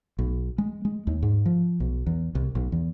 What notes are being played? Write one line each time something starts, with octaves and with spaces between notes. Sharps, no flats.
B1
G#3
G#3
D#2
G#2
F3
B1
E2
C2
B1
E2